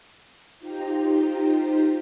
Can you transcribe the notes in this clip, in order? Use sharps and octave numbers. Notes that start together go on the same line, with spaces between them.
D#4 F4 G4 C5 G5 A#5